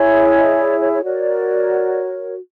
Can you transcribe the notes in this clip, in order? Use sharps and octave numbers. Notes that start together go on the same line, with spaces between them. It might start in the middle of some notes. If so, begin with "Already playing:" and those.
Already playing: E4 G#4 C#5
E5
D#5
D5
C#5
C#5
F#4 A#4 C#5 D5